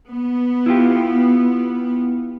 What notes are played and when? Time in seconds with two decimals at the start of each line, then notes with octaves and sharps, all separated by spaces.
0.10 B3
0.66 E4 F4 G4